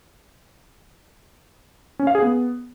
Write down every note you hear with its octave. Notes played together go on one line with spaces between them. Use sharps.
C#4
F5
G#4
B3